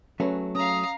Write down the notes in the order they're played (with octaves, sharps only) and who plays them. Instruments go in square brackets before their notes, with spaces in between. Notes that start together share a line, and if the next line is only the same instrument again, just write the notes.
[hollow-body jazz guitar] F#3 A3 [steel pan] C#4 B4
[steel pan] C#4 [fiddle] F5 A#5 [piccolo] D#6